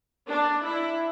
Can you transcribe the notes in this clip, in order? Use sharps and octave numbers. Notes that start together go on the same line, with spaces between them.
D4
E4